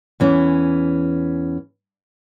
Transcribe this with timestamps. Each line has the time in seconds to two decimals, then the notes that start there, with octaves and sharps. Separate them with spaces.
0.20 E2 E3 C#4